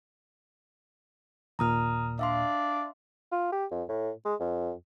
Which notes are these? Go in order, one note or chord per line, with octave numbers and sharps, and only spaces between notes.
D#2 A#2 A#5 D#6 F6
D4 D5 E5 F5 C6
F4
G4
F2
A2
G#3
F2